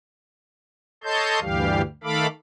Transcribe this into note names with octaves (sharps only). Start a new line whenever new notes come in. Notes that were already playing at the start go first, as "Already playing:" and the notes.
A4 C#5 D#5 A5 C6 G6
D2 G2 E3 G3 G4 F5
D#3 A3 A4 F5 B5 D6